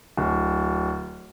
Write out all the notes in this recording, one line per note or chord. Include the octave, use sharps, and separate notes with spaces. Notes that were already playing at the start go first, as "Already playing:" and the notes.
D1